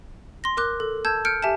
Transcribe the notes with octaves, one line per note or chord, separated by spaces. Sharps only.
C6 A#6
A#4 D6 F#6
A4
A5 E6 G6 G#6
F6 G6 C#7 D7
G4 E5 G#5 A5